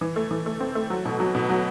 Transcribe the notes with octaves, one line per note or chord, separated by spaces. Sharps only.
E3
A3
E3
A3
C4
A3
F#3
B2
F#3
B2
F#3